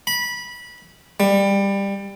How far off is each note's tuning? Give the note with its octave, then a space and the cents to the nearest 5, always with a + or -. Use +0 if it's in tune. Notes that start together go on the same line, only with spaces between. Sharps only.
B5 -20
G3 +15